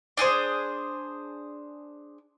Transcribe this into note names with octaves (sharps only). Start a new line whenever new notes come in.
D4 G#4 A4 C5